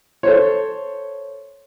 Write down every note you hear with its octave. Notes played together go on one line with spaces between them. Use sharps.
A4 C5 C#5